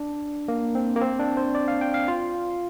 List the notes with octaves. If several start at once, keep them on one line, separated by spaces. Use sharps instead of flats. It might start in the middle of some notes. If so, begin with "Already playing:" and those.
Already playing: D4
A#3
C4
A#3
C4
D4
C5
D5
F5
G5
F5
F4